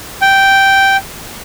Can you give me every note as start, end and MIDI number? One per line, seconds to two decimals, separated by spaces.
0.21 0.97 79